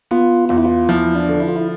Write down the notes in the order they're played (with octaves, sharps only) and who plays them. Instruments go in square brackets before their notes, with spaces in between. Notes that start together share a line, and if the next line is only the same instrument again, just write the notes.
[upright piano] B3 [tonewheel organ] F4
[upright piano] E2 [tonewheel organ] F4
[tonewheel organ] E4
F4
[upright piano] F3 [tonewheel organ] E4
[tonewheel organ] D4
[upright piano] D3
[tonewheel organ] E4
F4
E4